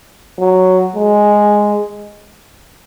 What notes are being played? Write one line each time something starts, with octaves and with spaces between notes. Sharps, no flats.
F#3
G#3